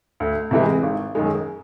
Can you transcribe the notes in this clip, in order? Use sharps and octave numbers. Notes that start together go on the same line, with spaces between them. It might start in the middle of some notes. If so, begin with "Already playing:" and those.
D2
C3 E3 G#3
G#1
F#2 D#3 G#3